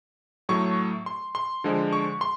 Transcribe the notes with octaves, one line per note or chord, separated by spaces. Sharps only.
A2 F#3 A3 C#6
C6
C6
D3 F3 G#3
C#6
C6